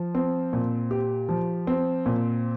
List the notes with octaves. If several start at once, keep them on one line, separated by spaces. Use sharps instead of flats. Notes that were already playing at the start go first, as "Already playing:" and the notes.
Already playing: F3
C4
A#2
G4
F3
C4
A#2